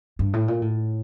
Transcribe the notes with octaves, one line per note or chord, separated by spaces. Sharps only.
G2
A2
A#2
A2